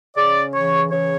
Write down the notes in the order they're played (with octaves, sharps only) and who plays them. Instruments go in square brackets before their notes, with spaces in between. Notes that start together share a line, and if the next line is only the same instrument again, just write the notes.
[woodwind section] C#3 D5
E3 C#5
C#3 C#5